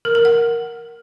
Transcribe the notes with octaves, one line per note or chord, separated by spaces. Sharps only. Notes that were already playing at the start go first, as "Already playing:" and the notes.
A#4
A#4
F#5